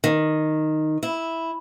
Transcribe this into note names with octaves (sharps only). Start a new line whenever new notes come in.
D#3
E4